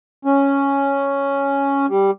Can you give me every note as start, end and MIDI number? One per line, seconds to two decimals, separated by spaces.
0.25 1.86 61
1.89 2.11 55